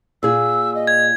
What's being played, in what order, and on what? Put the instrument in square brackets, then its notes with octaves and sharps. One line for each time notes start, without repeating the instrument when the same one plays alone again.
[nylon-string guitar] A#2 G#4 [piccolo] E6
[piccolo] D#5
[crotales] G#6